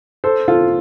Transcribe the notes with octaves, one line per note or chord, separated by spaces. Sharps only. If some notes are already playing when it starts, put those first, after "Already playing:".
A4 C5
F4 A4